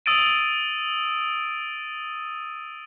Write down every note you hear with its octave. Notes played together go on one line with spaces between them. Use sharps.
D#6 E6 A6 D7 D#7